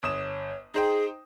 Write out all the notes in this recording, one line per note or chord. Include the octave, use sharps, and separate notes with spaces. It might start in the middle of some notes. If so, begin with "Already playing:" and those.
G1 C#5 D#6 E7
D#4 G#4 C5 G5